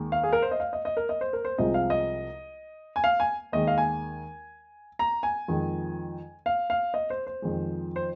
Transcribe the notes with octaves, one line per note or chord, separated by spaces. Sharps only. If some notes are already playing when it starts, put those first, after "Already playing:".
Already playing: D#2 D#3 G#3
F5
G#4
A#4
C5
D#5
F5
D#5
D#5
A#4
D#5
C5
A#4
C5
C2 C3 F3 G#3 D#5
F5
D#5
G#5
F5
G#5
D#2 D#3 G#3 D#5
F5
G#5
A#5
G#5
F2 D#3 G#3
F5
F5
D#5
C5
C5
F2 D#3 G#3
C5